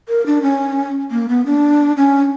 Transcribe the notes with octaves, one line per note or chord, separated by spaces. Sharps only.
A#4
D4
C#4
A#3
B3
D4
C#4